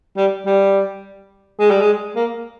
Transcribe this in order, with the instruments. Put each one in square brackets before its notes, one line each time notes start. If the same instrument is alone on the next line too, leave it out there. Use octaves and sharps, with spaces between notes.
[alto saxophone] G3
G3
G#3
G3
G#3
A#3